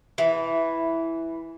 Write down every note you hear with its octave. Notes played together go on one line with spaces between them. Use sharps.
E3